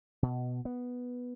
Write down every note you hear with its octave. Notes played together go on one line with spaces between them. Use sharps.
B2
B3